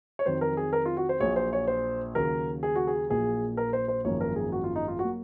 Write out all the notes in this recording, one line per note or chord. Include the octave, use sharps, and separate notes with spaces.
C#5
F2 D#3 F#3 C5
A#4
G#4
A#4
F4
F#4
C5
A#1 A#2 F#3 C#5
C5
C#5
C5
D#2 C#3 F#3 A#4
G#4
F#4
G#4
A#1 A#2 F#3 A#3 G#4
A#4
C5
C5
G#1 F#2 F3 A#3 C#5
A#4
G#4
F#4
F4
D#4
F4
F#4
F#3 A#3